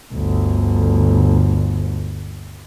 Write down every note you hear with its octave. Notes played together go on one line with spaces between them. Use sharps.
G1 D2